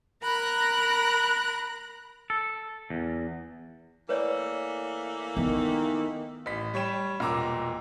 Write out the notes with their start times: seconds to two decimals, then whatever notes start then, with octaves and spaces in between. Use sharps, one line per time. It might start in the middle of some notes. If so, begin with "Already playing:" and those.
0.23 A#4 A#5 B5 F#6
2.30 A4
2.90 E2
4.09 E3 A3 A#3 B4 C#5 D5
5.37 D#3 B3
6.46 A1 B6
6.74 G3 C#5 G5 E7
7.20 E1 A#2 A#5 D6 E6